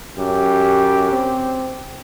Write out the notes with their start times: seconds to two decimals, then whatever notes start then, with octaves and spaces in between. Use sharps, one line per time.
0.18 F#2 G4
1.13 C4